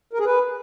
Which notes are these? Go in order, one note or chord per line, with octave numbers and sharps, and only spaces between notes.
A#4
G#4
B4